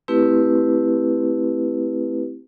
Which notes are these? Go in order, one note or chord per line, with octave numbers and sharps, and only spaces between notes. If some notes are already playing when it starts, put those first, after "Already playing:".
A3 C4 E4 G4 B4